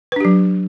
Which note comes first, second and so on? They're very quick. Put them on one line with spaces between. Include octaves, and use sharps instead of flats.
B4 D4 G4 F#3